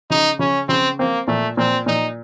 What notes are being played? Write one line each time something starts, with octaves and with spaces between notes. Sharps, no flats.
C#3 D#4
C#3 C#4
C#3 C4
A#3 C4
A#2 A3
A#2 C4
A#2 D#4